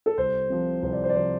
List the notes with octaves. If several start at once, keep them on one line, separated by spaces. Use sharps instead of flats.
A4
C2 C5
C3 F3
C2 C5
D5
C5
D5
C3 F3 C5